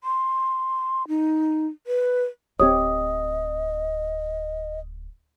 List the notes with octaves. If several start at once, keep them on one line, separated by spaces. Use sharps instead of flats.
C6
D#4
B4
D1 C4 G4 C#5 D#5 D#6